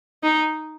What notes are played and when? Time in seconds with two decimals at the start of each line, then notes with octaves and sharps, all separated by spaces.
0.23 D#4